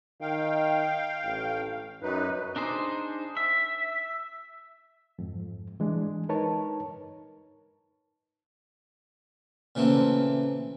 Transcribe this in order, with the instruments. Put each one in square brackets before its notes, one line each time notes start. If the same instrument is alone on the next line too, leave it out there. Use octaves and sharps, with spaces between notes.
[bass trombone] D#3 [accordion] F5 G5
[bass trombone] A1
[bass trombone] F#2 [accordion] D#4 B4
[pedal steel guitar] D4 D#4 G#4 C5
E5
[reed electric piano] F2 G#2
E3 G#3 D4
D#4 A#4 B4 C#5 A5
[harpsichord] A#2 C#3 E3 A3 A#3 C4